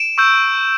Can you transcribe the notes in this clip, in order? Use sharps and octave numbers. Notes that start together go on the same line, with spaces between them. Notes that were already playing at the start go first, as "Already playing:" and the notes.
Already playing: D7 E7
C#6 E6 G6